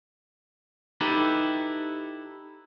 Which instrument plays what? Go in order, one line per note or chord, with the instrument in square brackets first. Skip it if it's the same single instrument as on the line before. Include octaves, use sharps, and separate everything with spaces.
[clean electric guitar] D#4 E4 G4 A4 B4